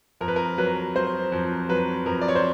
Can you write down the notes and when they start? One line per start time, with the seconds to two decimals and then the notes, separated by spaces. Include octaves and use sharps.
0.21 F2 A#4
0.28 B4
0.36 A#4
0.58 F#3 B4
0.95 F#3 C5
1.32 F2
1.69 F#3 B4
2.06 F2 A#4
2.21 D5
2.28 C#5
2.35 C5